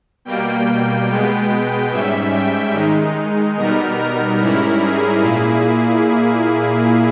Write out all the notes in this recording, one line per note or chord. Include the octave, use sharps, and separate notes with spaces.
B2 G3 A#3 G5
B2 G#3 B3
G#2 G3 C#4 E5
G5
D#3 G#3 D#4
B2 G3 B3 D#4 A#4
A#4
G#2 G3 C#4 E4
G#4
A#2 A#3 E4